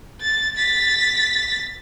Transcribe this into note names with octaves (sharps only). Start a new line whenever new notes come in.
A6
A6 B6